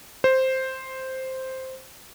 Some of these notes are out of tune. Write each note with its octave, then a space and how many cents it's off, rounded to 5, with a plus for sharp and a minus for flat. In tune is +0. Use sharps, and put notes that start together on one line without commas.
C5 +0